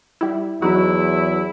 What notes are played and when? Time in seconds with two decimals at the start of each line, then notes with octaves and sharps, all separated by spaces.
0.21 G3 E4
0.62 E2 F#3 D#4 E4 F#4